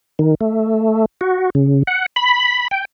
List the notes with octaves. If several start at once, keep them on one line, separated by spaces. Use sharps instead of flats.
D#3
A3
F#4
C#3
F#5
B5
G5